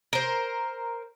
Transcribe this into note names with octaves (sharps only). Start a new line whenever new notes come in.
A#4 C5